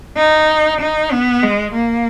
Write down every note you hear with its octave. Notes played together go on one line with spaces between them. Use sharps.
D#4
D#4
B3
G#3
A#3